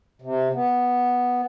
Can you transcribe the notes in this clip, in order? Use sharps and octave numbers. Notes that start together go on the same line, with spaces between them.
C3
B3